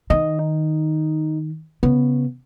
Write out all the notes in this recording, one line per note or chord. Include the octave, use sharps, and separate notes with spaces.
D#3 D#5
D#4
C#3 B3